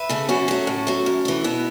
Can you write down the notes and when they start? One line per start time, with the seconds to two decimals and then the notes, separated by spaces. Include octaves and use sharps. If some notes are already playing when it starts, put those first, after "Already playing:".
Already playing: B4 E5
0.09 C#3 A3
0.29 F#2 C#4 F#4
0.48 F#3 A3
0.67 A2
0.87 F#3 A3
1.06 F#2
1.25 E3 A3
1.44 B2 B3 E4